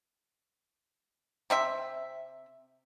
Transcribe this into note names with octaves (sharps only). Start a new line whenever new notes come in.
C3 C4 E5